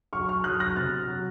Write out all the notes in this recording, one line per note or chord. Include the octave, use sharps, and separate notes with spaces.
F#3 C#6 F6
C#6 F6
F#3 D#6 F#6
F#6 A#6
C3 F6 A6
F#3